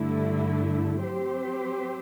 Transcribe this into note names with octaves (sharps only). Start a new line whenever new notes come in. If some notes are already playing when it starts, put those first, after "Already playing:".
Already playing: G2 D3 A3 E4
F#3 C4 G4 C5